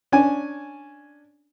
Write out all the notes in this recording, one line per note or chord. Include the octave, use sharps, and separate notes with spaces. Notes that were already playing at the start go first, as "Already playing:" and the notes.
C#4 D4 G#5